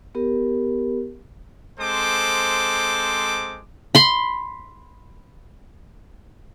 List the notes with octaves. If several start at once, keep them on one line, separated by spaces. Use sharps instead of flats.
B3 G4 A#4
G#3 C4 A4 C5 D6
B5 C6